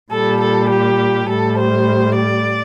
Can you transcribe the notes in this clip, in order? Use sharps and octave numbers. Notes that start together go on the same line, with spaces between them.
A#2 G3 A4
A4
G4
A2 G3 A4
C5
D5